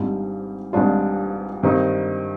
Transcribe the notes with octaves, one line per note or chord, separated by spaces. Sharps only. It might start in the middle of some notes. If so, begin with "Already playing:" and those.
Already playing: G#1 G#2 G3 D4 F4
G#1 G#2 G3 D4 F4
G2 D#3 G3 C4 D#4